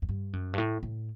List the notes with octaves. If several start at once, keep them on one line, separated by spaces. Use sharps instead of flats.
F#2
G2
F#2
G2
A2
A2